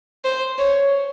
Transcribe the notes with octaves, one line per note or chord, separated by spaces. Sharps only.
C5
C#5